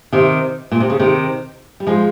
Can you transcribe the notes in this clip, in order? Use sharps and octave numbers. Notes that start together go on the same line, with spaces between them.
C3 D#3
A#2
C3
C#3
C3 D#3
G3
F3 G#3